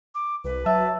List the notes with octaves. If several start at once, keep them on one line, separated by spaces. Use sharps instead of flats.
D6
C2 B4
F#3 E5 A5